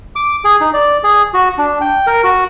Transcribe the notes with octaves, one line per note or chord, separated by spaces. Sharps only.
D6
G#4
D#4
D5
G#4
F#4
D4
G5
A#4
F#4